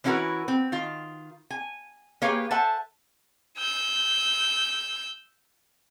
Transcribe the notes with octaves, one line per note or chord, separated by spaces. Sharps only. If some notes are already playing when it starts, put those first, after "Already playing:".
E3 C#4 E4 F#4 A#4 B4
C4
D#3 F4
G#5
A#3 G4 G#4 B4 C#5 F5
A4 C5 E5 F#5 G#5 A5
E6 G6